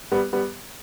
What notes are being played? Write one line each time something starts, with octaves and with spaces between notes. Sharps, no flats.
G3 B3
G3 B3